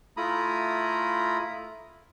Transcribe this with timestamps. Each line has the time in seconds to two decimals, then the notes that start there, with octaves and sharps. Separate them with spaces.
0.17 A3 E4 F4 A#5 B5 D#6